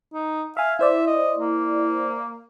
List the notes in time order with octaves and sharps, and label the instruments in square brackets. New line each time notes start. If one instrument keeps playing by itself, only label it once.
[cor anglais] D#4
[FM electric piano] E5 G#5 [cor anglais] F5
[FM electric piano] E4 C5 D5 [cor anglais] E5
[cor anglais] D#5
A#3